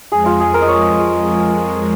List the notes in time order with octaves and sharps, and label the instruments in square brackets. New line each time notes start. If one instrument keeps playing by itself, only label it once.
[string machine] F2 F3 G#3 [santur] G#4
[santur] F4
G#4
A#4
D#5
C#5